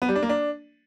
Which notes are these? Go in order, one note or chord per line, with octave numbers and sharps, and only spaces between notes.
B3
G3
D4
A#3
D4